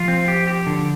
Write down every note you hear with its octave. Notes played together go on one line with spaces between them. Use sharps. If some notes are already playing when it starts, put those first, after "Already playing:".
Already playing: F3 F4
C4
G4
G4
D3